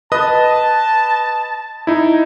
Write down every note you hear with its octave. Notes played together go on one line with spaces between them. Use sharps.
B4 D#5 A5 D#6
D#4 E4